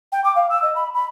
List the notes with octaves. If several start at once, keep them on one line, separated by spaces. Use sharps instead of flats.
G5
D6
F5
E6
D#5
B5
B5